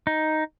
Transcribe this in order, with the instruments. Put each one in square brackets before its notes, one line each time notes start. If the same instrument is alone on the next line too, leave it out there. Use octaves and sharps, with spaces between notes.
[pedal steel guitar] D#4